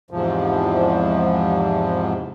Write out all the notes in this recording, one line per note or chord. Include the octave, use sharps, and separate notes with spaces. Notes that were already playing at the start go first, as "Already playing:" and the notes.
E2 G#2 C3 F3